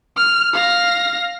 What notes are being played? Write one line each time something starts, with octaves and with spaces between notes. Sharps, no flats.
F6
F5 A#6